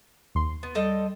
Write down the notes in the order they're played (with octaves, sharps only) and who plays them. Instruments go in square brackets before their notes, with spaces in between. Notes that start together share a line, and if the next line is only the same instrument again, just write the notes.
[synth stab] D#2 C6
[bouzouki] B3
[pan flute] G3 [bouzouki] A4 D#5 G5